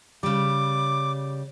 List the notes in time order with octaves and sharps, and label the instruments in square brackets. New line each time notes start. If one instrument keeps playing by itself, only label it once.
[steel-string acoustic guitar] C#3 G3 [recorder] D6